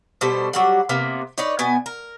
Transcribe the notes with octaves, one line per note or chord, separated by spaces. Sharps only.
B2 G3 A4 C5
F#3 G3 F#5
C3 A#3 B3
D#4 B4 C#5 D5
B2 B3 G#5
A#4